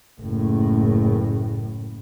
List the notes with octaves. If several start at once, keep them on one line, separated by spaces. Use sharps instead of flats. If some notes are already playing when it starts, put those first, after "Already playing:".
F#1 A2